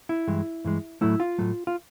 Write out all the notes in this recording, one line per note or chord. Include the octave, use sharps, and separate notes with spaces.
E4
G2 E3 G#3
G2 E3 G#3
A2 F#3 A3 E4
F4
A2 F#3 A3
F4